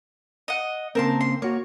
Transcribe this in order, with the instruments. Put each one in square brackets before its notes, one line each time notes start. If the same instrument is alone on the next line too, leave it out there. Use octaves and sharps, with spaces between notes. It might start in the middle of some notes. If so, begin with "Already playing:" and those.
[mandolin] D#5 F#5
[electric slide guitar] C#3 A#3 C4 [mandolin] A#4 A5 C6
[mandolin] C6
[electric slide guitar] A#3 F#4 [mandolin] C#5